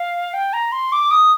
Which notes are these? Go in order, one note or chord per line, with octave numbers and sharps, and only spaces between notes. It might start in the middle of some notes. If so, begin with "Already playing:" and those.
Already playing: F5
G5
A#5
C6
D6
D#6